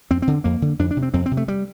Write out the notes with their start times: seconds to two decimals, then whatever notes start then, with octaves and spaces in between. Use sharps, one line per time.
0.10 F2 C4
0.22 C4
0.27 D3
0.44 F2 A#3
0.62 D3
0.79 F2 D4
0.91 D4
0.97 C3
1.02 C4
1.14 F2 C4
1.26 C4
1.31 C3
1.37 A3
1.48 G3